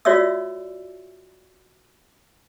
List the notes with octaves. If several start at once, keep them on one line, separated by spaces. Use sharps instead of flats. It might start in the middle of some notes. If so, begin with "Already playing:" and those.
F4 F#4 C#5 D5 E5 E6